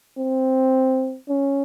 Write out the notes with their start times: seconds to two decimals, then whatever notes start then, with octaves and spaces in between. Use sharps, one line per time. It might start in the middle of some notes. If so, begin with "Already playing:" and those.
0.18 C4
1.29 C#4